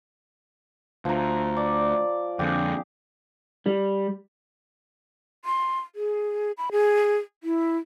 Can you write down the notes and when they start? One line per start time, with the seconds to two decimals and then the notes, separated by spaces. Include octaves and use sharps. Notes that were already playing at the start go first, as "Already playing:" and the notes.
1.05 D2 F3 A#5
1.57 D5
2.39 F2 D3 G4 G#4
3.66 G3
5.45 C6
5.96 G#4
6.58 B5
6.72 G#4
7.43 E4